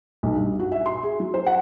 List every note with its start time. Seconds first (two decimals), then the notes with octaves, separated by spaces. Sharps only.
0.23 B1
0.36 G2
0.59 F#4
0.72 E5
0.86 C6
1.03 G#4
1.20 F#3
1.34 C5
1.46 F#5